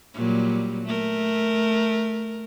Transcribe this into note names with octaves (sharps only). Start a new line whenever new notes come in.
A#2 F#3 G3
A3 A#4